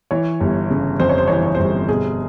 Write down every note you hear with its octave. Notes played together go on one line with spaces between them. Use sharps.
E3 C#5
G1
C#3
F2 C5
C#5
C5
E3 C#5
C5
C#5
G1 C5
B2 G#4